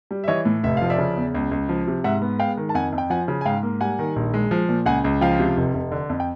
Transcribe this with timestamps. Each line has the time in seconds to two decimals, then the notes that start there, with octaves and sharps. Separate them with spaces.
0.11 G3
0.24 E5
0.28 E3 C#5 D#5
0.45 A2
0.64 F1 E5
0.77 F3 F5
0.90 D5 E5
0.98 C#3
1.17 E2
1.35 C#2
1.51 C#2
1.69 F3
1.87 C3
2.04 G#2 E5 F#5
2.22 B3
2.39 G#3 F5 G5
2.57 D#3
2.69 A5
2.75 F2 F#5 G#5
2.93 F2
2.98 G5
3.10 F3 F#5 G#5
3.28 C#3
3.41 G#5
3.46 G#2 F5 G5
3.63 A#3
3.81 G3 F#5 G#5
3.99 D#3
4.16 A#1
4.34 G#3
4.51 F3
4.69 A#2
4.86 C#2 F#5 G#5
5.04 C#2
5.21 F3 F5 G5
5.40 C3
5.57 F1
5.74 F1
5.92 D3
6.10 F2
6.20 G5